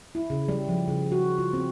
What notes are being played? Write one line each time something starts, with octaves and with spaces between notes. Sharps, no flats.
E4
C#3
G3
F3
C#3
F#4
F4
C4